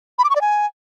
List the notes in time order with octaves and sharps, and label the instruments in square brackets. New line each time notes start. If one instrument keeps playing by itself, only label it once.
[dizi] B5
D6
C#6
D5
G#5